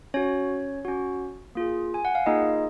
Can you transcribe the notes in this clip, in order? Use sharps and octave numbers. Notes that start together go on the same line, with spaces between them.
C#4 F#4 C#5
C#4 F#4
A#3 F4 G#4
G#5
F#5
F5
A#3 D#4 F4 G#4 D#5